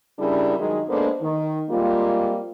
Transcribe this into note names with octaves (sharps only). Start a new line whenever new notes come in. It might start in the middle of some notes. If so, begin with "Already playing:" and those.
C#3 G3 D4 E4 G#4 A#4
G2 D#3 F#3 G#3 G#4 D#5
G#3 A#3 B3 D4 A4 C5
D#3
G3 G#3 A#3 C4 F4